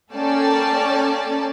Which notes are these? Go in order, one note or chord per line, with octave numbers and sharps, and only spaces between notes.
A#3 C#4 A4 D5 G5 A5